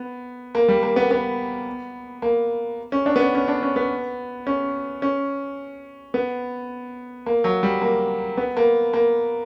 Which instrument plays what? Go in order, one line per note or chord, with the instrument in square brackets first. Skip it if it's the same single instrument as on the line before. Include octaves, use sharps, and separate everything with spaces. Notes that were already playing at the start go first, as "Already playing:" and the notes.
Already playing: [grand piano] B3
A#3
G3
A#3
B3
B3
A#3
C#4
D4
B3
C#4
C#4
D4
C#4
B3
C#4
C#4
B3
A#3
F#3
G3
A#3
B3
A#3
A#3